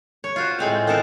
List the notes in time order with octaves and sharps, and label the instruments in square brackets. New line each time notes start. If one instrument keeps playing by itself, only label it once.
[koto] C#5
F4 F#4 C5
A2 G#3 C4 F5
B3 C4 D#4 A4 A#4 C5